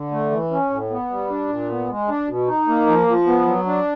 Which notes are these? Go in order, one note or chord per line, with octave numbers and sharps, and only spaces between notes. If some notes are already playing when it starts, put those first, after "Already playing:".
Already playing: D3
A3
E3
C#4
A2
B3
G3
D4
A#2
B3
G#3
D4
B2
D#4
A#3
F3
F3
B3
F#3
D4